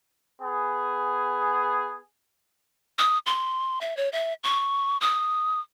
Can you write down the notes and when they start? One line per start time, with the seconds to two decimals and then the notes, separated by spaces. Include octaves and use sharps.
0.41 B3 G#4
2.99 D#6
3.26 C6
3.81 E5
3.97 C#5
4.13 E5
4.44 C#6
5.01 D#6